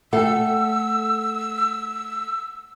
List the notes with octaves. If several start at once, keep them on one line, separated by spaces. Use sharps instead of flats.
A3 A4 F#5 G5 E6